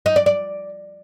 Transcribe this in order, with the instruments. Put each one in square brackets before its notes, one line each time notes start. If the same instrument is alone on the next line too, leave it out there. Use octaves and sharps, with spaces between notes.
[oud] D#4
D5
D5